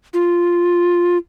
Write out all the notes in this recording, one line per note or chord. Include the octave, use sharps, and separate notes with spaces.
F4